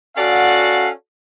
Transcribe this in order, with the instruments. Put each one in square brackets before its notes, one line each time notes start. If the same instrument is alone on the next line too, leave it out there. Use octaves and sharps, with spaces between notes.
[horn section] C#4 F#4 A4 D5 F5 F#5